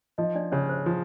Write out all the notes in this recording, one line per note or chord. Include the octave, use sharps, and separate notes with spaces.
F3 D#4 D#5
D4 D5
C#3 C#4 C#5
C5
F3